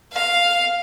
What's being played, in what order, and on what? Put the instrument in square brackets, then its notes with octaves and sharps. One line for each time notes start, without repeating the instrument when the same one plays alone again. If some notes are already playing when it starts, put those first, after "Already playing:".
[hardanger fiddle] F5